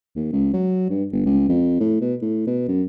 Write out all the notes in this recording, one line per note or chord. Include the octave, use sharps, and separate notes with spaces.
D#2
C#2
F#3
G2
G1
C#2
F2
A2
B2
A2
B2
F#2